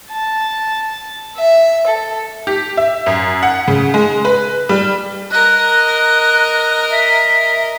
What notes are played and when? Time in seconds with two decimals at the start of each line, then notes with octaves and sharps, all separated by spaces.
0.12 A5
1.37 E5
1.87 A4
2.47 G4
2.77 E5
3.06 F#2
3.43 F#5
3.68 C#3
3.94 G#3
4.25 B4
4.69 G3
5.31 A#4 D#5 F#6
6.90 E5